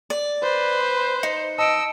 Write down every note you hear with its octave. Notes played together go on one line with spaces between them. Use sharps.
D5
B4 C5
D#4 C#7
D#5 A5 E6 C#7 D7